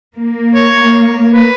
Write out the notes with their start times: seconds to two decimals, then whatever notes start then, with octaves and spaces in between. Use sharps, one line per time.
0.16 A#3
0.54 C#5
1.33 B4